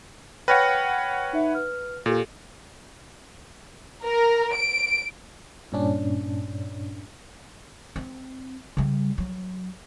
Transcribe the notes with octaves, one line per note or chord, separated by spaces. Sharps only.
B4 C#5 F#5 G5 F6 A#6
D#4 E5
B4 F6
A#2 G4 A4
A#4
D7
G2 A#2 C#4 D4
C4
C#3 G3
F#3